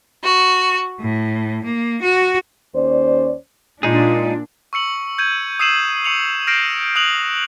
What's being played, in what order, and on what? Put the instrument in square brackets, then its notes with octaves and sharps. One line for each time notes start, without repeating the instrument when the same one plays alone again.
[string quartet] F#4
A2
A#3
F#4
[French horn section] D#2 C#4 C5 D5
[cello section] A#2 D4 [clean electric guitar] G#3 D#4 G#4 [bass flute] F4
[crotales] C#6 E6 C#7 F#7
G6 G#6 D#7
D#6 E6 C7 D#7 E7 F#7
C#6 C#7 F7 F#7
F6 G6 A#6 C7 D7 E7
D#6 F#6 G6 F7 F#7